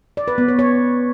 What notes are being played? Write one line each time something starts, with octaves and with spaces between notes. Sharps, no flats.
D5
B4
B3
C#5
C#5